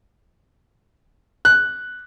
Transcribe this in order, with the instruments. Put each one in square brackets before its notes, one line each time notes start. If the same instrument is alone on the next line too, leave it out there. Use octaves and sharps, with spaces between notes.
[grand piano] F#6